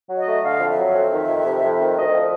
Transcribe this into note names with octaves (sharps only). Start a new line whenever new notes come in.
F#3
D#5
A3
D3 F5
F2
E5
F#3
F2
D#3
F2
C3
F2
D#3
D2 D#5
F3